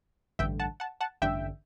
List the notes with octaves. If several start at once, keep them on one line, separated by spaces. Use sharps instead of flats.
A1 G2 D3 E5 G5
F#5 A5
F#5 A5
F#5 A5
A1 G2 D3 E5 G5